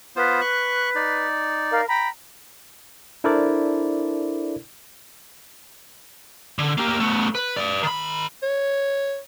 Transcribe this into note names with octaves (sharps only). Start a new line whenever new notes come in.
B3 F4 B4 C5
C#6 F#6
D#4 D5
A#4 F5
G5 A#5 B5
D4 E4 A4 A#4 C5 D5
D3
A#3 G4
A3 B3
B4
B4 D5
D#3 B5
C#5